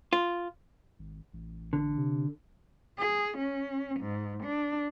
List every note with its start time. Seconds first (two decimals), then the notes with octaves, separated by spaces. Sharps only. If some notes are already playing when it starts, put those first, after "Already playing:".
0.13 F4
0.99 G#1
1.33 A1
1.73 D3
1.97 C3
2.98 G#4
3.37 C#4
3.99 G#2
4.42 D4